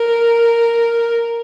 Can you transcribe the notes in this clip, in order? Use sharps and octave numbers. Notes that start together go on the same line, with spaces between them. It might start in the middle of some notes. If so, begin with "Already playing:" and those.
Already playing: A#4